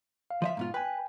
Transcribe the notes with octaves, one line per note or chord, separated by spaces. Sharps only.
F5
F3 D#5 E5
G#2 B2 F4
B4 G5 G#5